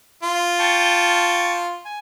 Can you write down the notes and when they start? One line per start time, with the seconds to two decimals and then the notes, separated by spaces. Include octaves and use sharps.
0.23 F4
0.59 G5 A5 C#6
1.85 G#5